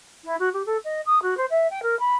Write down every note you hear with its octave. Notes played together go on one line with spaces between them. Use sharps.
E4
F#4
G4
A4
D#5
D#6
F#4
C5
E5
G5
A#4
B5